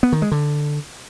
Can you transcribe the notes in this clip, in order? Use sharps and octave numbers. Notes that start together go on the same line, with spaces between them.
B3
D#3
G#3
D3